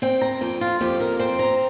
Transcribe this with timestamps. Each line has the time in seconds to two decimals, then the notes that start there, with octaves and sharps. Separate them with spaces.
0.02 C4 G5
0.21 A#5
0.41 F2 G5
0.61 F4
0.81 F2 G4
1.00 A#4
1.19 C4 C5
1.39 A#5